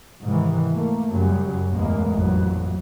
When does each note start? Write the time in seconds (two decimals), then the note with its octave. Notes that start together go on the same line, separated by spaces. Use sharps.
0.22 G#2 C3 D#3 E3
0.73 A3 A#3
1.10 F#2 C#3 F#3 G3
1.72 A1 E2 G#3 A#3
2.14 A1 F2 A#2 F#3